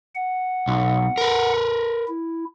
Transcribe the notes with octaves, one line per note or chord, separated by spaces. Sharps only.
F#5
B1
A#4 B4
E4